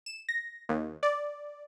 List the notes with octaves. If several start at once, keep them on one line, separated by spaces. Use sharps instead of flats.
E7
A#6
D#2
D5